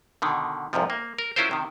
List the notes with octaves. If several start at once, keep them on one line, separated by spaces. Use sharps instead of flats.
B2 D3 D#3
C2 F2 G#2 C3 F3
A#3
A#4
F#3 C#4 E4 F4 A#4 C5
C3 D#3